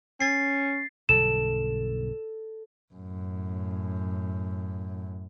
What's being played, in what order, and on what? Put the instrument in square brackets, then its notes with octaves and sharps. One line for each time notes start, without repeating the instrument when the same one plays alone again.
[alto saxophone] C#4 [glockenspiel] A6 C7
[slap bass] B1 G2 D3 [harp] A4 [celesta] E7
[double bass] F#2 A2